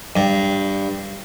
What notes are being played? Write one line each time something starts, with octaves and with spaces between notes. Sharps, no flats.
G2